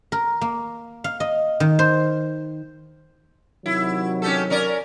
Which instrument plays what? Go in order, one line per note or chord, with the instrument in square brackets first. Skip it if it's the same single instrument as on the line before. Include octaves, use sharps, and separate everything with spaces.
[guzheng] A#4
A#3
F5
D#5
D#3
C5
[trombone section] C3 D#3 F#3 [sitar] E4
[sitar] C#4 G4 A4
C#4 A#4 D5